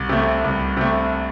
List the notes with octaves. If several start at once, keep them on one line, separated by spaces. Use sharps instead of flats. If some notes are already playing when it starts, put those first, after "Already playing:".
Already playing: C2
C3 A3
C2
C3 A3